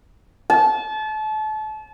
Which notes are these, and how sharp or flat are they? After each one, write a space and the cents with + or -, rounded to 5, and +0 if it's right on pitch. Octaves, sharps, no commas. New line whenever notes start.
A5 -30